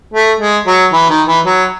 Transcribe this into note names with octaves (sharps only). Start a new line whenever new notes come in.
A3
G#3
F#3
E3
D#3
E3
F#3